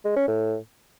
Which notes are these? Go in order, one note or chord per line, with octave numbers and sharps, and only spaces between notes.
G#3
C#4
A2